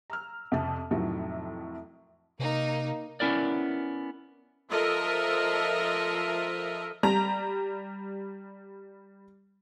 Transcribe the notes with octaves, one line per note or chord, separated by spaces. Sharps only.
A#5 E6 F6
F2 C3 A5
F2 A2 C3 D#3 F3 F#3
C3 A#3 D#4
B3 C#4 E4 A#4 D5
F3 A4 A#4 D#5 E5
G3 A#5